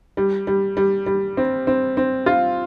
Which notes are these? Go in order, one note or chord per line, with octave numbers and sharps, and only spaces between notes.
G3
G3
G3
G3
C4
C4
C4
F4